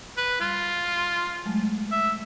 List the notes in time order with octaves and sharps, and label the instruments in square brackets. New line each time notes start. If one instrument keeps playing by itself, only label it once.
[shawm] B4
[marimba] G3 [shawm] F4
[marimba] F#3 G#3 A3
[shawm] E5